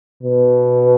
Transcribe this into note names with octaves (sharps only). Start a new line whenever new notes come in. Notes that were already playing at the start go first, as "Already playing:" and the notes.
B2